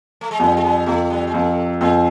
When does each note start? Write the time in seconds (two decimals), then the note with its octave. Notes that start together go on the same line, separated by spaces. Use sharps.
0.21 A3
0.31 G#3
0.39 F2 G3
0.57 G#3
0.64 G3
0.86 F2 A3
1.10 G3
1.27 G#3
1.34 F2 A3
1.81 F2 G#3